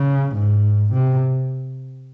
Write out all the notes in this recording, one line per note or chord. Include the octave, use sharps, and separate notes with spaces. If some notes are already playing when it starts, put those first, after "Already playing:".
Already playing: C#3
G#2
C3